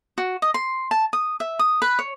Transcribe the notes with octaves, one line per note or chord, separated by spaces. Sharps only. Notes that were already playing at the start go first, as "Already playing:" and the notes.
F#4
D#5
C6
A5
D#6
E5
D#6
B4
C#5